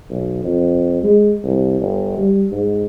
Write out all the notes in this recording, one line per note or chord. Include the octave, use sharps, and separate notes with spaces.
B1
F2
G#3
C2
G1
G3
G#2